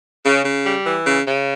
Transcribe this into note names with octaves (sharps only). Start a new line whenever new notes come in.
C#3
C#3
G3
E3
C#3
C#3